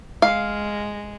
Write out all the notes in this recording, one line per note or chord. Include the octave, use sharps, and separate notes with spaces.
G#3 F5